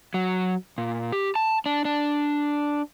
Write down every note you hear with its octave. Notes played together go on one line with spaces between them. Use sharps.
F#3
A#2
G4
A5
D4
D4